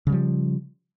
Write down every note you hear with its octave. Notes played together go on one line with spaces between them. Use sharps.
C#3 F3 G3